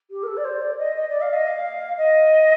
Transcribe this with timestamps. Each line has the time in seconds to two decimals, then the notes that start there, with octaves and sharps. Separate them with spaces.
0.10 G4
0.23 A#4
0.27 A4
0.36 D5
0.44 C5
0.61 D5
0.78 D#5
0.95 D#5
1.08 D5
1.21 F5
1.33 D#5
1.46 F5
1.97 D#5